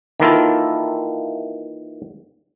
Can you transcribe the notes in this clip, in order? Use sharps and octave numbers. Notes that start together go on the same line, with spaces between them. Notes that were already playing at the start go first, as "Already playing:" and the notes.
D#3 E3 A#3 E4 F4 A4